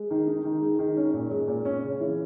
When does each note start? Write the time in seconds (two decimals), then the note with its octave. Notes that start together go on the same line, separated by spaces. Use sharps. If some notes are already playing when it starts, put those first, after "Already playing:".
Already playing: G#3
0.10 D#3
0.27 D#4
0.44 D#3
0.61 G#3
0.79 D#3
0.97 C#4
1.13 A#2
1.31 G#3
1.48 A#2
1.65 C#4
1.82 C#3
2.00 E3